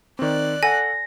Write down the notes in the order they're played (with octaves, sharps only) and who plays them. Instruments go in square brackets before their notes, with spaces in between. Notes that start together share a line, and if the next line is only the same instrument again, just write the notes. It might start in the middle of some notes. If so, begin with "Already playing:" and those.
[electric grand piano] D#3 C4 [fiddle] D5 F#6
[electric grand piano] A4 F#5 [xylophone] G#5 [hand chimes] A#6